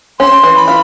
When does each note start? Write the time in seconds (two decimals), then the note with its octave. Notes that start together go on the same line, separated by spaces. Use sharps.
0.20 C#4 C6
0.43 E3
0.56 B5
0.68 F4